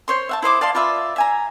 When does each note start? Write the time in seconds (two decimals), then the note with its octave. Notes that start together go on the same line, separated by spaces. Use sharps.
0.08 C5 C#5 C6
0.29 E5 F#5 A5
0.42 E4 C5 D#5 D6
0.61 D5 F5 A5 C6
0.75 F4 B4 D5 E5
1.16 E5 G#5 A#5